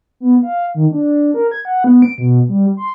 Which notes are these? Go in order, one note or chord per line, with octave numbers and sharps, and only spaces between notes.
B3
F5
D#3
D4
A#4
G#6
F#5
B3
D7
B2
G3
C6